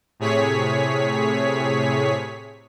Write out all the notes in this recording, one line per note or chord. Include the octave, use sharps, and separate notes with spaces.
A2 C3 G#4 C#5 B6